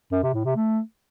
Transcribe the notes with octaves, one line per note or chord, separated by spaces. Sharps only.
F#2
C3
A2
C3
A3